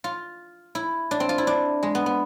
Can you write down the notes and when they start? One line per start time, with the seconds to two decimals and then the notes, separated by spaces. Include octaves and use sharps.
0.04 F4
0.75 E4
1.11 D4
1.20 C4
1.29 F4
1.38 E4
1.47 D4
1.83 G#3
1.95 B3
2.06 B3